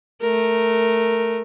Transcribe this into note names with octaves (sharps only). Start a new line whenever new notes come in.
A3 A#4